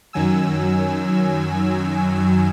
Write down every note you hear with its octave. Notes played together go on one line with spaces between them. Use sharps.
F#2 D#3 F#3 G#5 E6